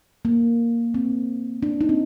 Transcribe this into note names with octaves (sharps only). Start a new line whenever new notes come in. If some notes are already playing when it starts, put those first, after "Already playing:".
A#3
C4
D4
D#4
C4